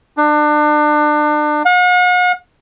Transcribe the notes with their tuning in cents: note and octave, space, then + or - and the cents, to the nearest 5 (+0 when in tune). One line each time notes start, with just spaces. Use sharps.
D4 +30
F#5 -45